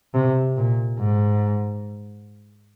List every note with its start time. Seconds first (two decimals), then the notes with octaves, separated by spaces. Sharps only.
0.14 C3
0.57 A#2
0.99 G#2